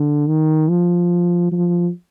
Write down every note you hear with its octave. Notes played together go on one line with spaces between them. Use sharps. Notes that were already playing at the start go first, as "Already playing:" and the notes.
Already playing: D3
D#3
F3
F3